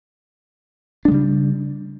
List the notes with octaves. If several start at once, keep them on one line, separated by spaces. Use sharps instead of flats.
C#3 G3 G#3 D4